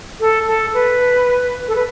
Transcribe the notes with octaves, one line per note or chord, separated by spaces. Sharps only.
A4
A4
B4
A4
B4